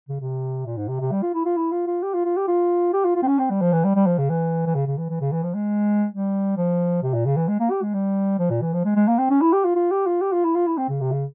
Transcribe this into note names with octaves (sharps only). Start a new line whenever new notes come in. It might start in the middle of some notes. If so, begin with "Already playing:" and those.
C#3
C3
A#2
G#2
C3
C3
G3
F4
E4
F4
E4
F4
F4
G4
F4
F4
G4
F4
G4
F4
F4
C4
C#4
C4
G3
F3
E3
G3
G3
F3
C#3
E3
E3
C#3
C#3
E3
E3
C#3
E3
F3
G#3
G3
F3
C3
A#2
C#3
E3
G#3
A#3
G4
G#3
G3
F3
A#2
E3
F3
G#3
G#3
A#3
C4
C#4
E4
G4
F4
F4
G4
F4
G4
F4
E4
F4
E4
C4
C#3
C3
C#3